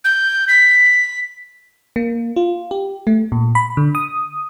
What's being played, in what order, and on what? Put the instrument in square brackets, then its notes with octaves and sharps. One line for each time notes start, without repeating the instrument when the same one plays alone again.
[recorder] G6
B6
[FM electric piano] A#3
F4
G4
A3
A#2
B5
D3
D#6